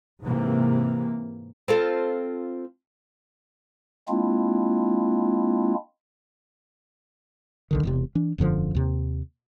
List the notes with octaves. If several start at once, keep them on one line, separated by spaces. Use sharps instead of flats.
G#2 C3 E3 A#3
C4 F4 A4
G#3 A#3 C4 D4 E4 F4
B1 D3 D#3
E1 E2 C3
E3 D4
E1 F#2 D3 F3
D#2 C3